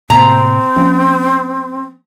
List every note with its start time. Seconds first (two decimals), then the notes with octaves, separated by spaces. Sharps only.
0.10 A2 C3 A#3 C4 A#5
0.76 F3 A#3 C#4